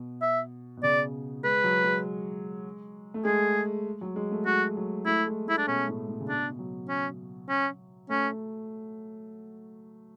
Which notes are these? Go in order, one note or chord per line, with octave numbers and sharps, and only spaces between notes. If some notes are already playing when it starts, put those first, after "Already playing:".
Already playing: B2
E5
B2
C#3 D5
G#3 B4
F#3
G#3
A3
G#3 G#4
F#3
G#3
A3
G#3 F#4
F#3
A3 E4
G#3
A3 E4
D4
B2 C#4
A2
A2
C#3
B2 D4
F#3
C#4
C#4
A3 C#4